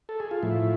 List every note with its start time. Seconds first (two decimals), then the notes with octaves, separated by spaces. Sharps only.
0.09 A4
0.20 G#4
0.31 F4
0.43 A2 F3 E4